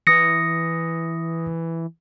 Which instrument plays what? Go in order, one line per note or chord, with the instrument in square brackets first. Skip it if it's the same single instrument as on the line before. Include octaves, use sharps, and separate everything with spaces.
[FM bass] E3 [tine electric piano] D#6 A#6 C#7